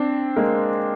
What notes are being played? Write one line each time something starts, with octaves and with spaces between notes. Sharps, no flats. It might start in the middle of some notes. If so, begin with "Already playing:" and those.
Already playing: C4 D4
G#3 A#3